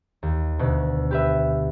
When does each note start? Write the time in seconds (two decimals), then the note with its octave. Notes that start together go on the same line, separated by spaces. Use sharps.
0.23 D#2
0.59 D2 B2
1.11 G4 B4 E5